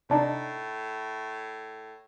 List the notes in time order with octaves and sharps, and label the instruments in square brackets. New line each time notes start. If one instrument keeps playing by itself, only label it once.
[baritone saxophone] A2 [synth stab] C3 D4 D#4